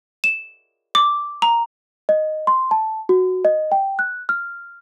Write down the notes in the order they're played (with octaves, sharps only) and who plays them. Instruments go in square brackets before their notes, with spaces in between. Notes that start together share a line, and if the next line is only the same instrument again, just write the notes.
[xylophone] E7
D6
A#5
[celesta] D#5
C6
A5
F#4
D#5
G5
F#6
F6